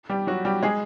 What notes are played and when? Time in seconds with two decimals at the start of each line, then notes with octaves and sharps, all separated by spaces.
0.10 G3 G4
0.27 F#3 F#4
0.45 G3 G4
0.63 G#3 G#4